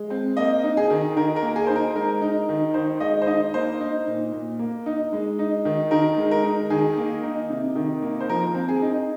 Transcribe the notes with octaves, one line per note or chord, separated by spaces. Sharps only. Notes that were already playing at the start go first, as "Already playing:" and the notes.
Already playing: G#3
C4
A#3 D#5
D#4
G#4
D#3
D#3 A#4
A#4
A#3
G#4
D#4 C5
A#4
G#3 A#4
D#4
D#3
D#3 C5
G#3 D#5
C5
D#4 D#5
A#3 C5
D#4
A#2
A#2
A#3
D#4
G#3
D#4
D#3
D#3 A#4
G#3
A#4
D#4
D#3 G#4
A#3
D#4
C3
D#3
A#3
C5
F3 A#4
C4
G#4
D#4